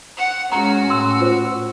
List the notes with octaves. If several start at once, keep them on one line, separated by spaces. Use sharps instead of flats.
F#5
G#3 C#4 F#4 A#5
A2 G5 C6 E6
F4 C5